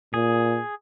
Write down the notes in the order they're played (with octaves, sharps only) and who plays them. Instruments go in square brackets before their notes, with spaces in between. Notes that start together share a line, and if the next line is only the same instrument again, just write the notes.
[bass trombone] A#2 [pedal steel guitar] G#4